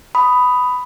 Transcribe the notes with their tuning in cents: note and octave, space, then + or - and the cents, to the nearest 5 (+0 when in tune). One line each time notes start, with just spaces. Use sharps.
B5 +10 D#6 +0